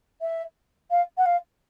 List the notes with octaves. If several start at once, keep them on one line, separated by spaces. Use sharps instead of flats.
E5
F5
F#5
F5